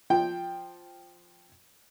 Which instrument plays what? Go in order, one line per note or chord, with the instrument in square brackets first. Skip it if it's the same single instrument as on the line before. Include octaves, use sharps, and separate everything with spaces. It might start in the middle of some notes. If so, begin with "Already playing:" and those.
[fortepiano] F3 G5